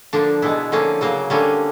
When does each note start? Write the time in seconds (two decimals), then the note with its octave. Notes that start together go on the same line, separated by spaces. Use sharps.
0.13 D3 F3 A#3 D4
0.42 B2 G#3 B3 E4
0.72 D3 F3 A#3 C#4
1.01 C#3 F#3 A#3
1.30 D3 G3 A#3 C#4